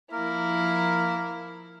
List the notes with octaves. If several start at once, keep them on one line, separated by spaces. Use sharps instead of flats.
F3 A#3 E4 A#4